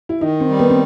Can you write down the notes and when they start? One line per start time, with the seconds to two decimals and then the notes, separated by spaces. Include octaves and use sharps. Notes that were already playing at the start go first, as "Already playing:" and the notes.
0.09 E4
0.21 D#3 D#4
0.40 C4
0.49 G3
0.59 B3
0.70 C4